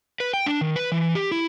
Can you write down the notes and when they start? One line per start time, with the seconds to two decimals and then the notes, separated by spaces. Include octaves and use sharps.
0.20 B4
0.33 G5
0.46 D4
0.61 D#3
0.76 B4
0.92 E3
1.15 G4
1.32 E4